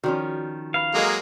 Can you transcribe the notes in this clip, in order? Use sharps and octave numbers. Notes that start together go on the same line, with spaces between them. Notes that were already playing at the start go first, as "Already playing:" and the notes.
D#3 F3 C#4 F#4 G#4 D5
B4 F5 B5
F#3 G#3 A#3 A4 D#5